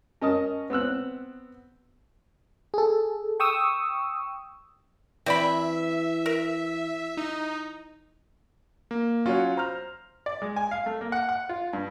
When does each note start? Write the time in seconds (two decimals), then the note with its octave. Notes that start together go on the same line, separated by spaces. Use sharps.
0.21 C#4 A#4 D#5 A5 D#6
0.70 B3 C4 E6 F#6
2.74 G#4 A4
3.40 G5 C#6 D#6 E6
5.26 E3 C4 D5 E5 B5
6.26 A#4
7.17 D#4
8.91 A#3
9.26 F#3 C#4 F4 F#4 C#5
9.57 C5 A#5 F6
10.26 D5
10.42 G#3
10.56 G#5
10.71 F5
10.86 A3
11.01 A#3
11.12 F#5
11.29 F#5
11.49 F4
11.73 G2